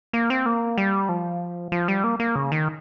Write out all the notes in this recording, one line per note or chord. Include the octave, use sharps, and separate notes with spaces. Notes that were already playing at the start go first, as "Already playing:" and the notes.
A#3
C4
A#3
G3
F3
F3
G3
A#3
A#3
C#3
D#3